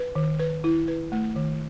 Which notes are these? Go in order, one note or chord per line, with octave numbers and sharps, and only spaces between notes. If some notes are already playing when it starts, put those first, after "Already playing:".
Already playing: B4
D#3
B4
E4
B4
A3
D#3